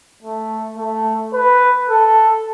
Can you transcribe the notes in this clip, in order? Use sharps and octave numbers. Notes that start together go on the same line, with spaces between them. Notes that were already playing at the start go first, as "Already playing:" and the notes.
A3
A3
B4
A4